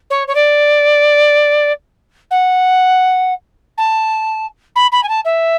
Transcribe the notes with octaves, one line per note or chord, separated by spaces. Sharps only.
C#5
C#5
D5
F#5
A5
B5
B5
G#5
A5
E5